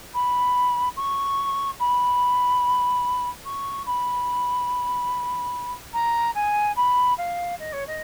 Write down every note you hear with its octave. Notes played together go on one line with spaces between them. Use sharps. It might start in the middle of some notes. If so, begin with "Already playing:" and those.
B5
C#6
B5
C#6
B5
A#5
G#5
B5
F5
D#5
C#5
D#5